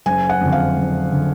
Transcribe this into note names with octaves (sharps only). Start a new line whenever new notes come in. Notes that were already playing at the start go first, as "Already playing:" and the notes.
F#1 G#5
F#5
F2 D3
F5
F#1
D3